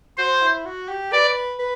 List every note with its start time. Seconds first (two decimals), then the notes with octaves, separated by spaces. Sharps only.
0.18 F#4 C5
0.42 E4
0.65 F#4
0.89 G4
1.12 B4 D5
1.59 B4